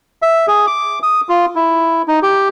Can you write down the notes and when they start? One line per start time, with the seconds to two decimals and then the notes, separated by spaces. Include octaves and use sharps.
0.22 E5
0.48 G#4
0.67 D6
1.03 D#6
1.29 F4
1.55 E4
2.08 D#4
2.23 G4